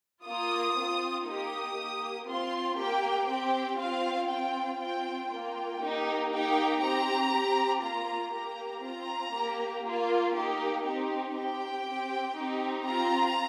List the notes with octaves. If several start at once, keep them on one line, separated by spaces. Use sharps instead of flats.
A#3 F4 D#6
C4 F4
A#3 D#4 G4 D#6
A#3 G4
C4 F4 C6
A#3 G4 G5
C4 G4 G5
C4 F4 F5
C4 F4 G5
C4 F4 G5
A#3 F4 G5
A#3 D#4 G4
A#3 D#4 G4 G5
C4 G4 A#5
C4 G4
A#3 F4 A#5
A#3 G4 A#5
C4 F4 A#5
A#3 G4
A#3 F4
A#3 D#4 G4
C4 D#4 G4
C4 G4 G5
C4 G4
C4 D#4 G4
C4 F4 A#5